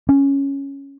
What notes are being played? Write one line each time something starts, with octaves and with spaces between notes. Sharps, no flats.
C#4